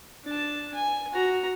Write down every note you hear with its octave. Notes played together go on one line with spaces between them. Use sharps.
D4 A5
G#5
F#4 A#5